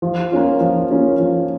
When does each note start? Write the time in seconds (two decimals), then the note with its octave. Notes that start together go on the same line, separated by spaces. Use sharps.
0.02 F3
0.32 A#3 C#4 F4
0.61 F3
0.91 A#3 C#4 F4
1.20 F3